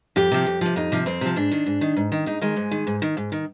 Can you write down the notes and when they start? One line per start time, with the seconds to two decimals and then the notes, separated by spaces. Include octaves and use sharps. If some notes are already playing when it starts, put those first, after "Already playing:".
0.16 F2 G4
0.32 C3 F3
0.46 F2
0.61 C3 F3
0.76 F2 D#4
0.92 C3 F3
1.06 F2 C4
1.21 C3 F3
1.36 G#2 D4
1.51 D#3
1.66 G#2
1.81 D#3
1.96 G#2
2.12 D#3
2.26 G#2 D#4
2.41 D#3 G#3
2.56 G#2
2.71 D#3
2.87 G#2
3.02 D#3
3.17 G#2
3.32 D#3